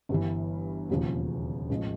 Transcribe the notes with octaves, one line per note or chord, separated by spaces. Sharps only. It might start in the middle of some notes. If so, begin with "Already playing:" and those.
G1 G2 E3
E1 D#2 C#3 F3
A1 F3 G#3